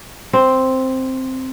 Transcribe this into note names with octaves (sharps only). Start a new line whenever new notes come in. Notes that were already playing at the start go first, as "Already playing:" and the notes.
C4